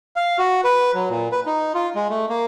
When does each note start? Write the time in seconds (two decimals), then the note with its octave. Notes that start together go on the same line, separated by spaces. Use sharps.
0.16 F5
0.39 F#4
0.64 B4
0.94 F#3
1.10 A#2
1.32 B4
1.46 D#4
1.75 F4
1.95 G#3
2.10 A3
2.29 A#3